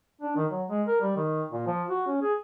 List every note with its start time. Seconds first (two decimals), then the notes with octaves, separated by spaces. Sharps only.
0.21 D4
0.37 D#3
0.51 F#3
0.69 G#3
0.87 A#4
1.01 G3
1.17 D#3
1.52 A#2
1.67 F3
1.90 F#4
2.07 C#4
2.22 G#4